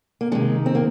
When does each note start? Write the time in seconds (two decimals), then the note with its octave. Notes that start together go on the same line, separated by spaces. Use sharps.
0.21 A#3
0.32 C3 D#3 G#3
0.66 C4
0.75 A#3